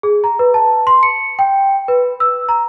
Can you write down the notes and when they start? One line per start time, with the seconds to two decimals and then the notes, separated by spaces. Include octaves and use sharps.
0.03 G#4
0.24 A#5
0.39 B4
0.54 A5
0.87 C6
1.03 C#7
1.39 G5
1.88 B4
2.20 E6
2.49 A#5